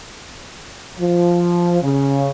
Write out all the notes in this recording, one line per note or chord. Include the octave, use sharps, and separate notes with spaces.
F3
C#3